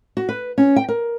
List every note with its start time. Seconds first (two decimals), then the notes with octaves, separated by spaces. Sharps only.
0.17 F#4
0.29 B4
0.58 C#4
0.76 G5
0.88 A#4